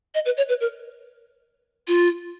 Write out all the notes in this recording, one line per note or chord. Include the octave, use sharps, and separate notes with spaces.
D#5
B4
C#5
B4
A#4
F4